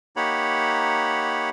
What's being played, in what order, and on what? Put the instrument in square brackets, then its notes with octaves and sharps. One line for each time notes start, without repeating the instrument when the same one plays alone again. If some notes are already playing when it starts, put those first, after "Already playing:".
[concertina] A#3 D#4 G4 C#5 F#5 B5